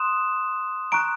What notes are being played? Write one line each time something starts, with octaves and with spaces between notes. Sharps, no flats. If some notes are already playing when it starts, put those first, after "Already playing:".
Already playing: C6 D#6 F#6 E7
A#5 C#6 F#6 D7